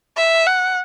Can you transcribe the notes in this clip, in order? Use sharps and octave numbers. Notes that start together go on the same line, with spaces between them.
E5
F#5